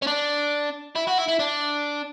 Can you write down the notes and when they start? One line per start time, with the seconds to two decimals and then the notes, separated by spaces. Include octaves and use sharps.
0.02 C#4
0.07 D4
0.95 E4
1.07 F#4
1.18 E4
1.28 E4
1.39 D4